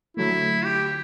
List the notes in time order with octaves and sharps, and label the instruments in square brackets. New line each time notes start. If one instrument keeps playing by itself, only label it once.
[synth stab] D3 F#3 A3 [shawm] E4
[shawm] G4